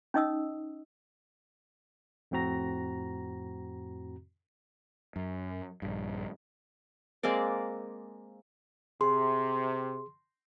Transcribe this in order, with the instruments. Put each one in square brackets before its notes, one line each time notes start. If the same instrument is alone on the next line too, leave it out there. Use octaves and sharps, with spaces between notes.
[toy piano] C#4 D#4 D#5 D#6 E6
[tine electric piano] F2 A2 C4 F#4 A#5 A#6
[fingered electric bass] F#2
A#1 G2
[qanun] G#3 A#3 C4 D5
[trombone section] C3 [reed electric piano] G#4 [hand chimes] C6